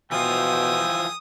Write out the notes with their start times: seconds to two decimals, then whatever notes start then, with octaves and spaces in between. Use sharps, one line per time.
0.12 B2 E3 F3 F4 G5 G#5 D#6 E6